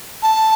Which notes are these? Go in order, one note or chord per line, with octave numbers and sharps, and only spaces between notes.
A5